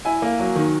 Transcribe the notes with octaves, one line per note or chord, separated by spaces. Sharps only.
E4 G#5
A#3
F#3
D#3